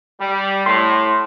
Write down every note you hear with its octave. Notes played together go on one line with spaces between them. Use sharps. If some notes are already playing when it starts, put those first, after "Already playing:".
G3
A2 C6